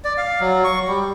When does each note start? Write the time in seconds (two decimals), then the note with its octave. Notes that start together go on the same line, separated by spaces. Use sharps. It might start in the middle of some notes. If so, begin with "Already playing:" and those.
0.04 D5
0.17 F5
0.41 F#3
0.64 C#6
0.88 G3